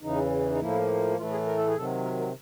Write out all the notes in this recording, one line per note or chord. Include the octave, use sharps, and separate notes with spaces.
E2 C#3 E3 D#4
D#4
A2 F3 A#3 E4
A2 E3 A3 F4
G#4
A#4
A4
G#4
C3 D#3 F#3 A4
A#4
A#4